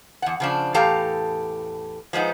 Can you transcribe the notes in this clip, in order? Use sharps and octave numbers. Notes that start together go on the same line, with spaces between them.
E2 F#5
C#3 F3 D4
E2 A2 G4 A4 F5 A#5
F3 G#3 B3 D#4